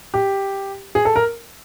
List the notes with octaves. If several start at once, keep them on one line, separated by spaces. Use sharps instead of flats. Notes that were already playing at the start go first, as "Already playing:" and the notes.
G4
G#4
A4
A#4